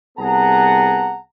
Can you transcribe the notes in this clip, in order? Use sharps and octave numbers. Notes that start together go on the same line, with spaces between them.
C2 B3 G#4 F#5 A5 A#5